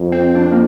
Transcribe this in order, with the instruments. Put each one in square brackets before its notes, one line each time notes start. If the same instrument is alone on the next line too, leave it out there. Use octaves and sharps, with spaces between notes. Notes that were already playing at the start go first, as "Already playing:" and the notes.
Already playing: [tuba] F2
[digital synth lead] C4
D4
A#3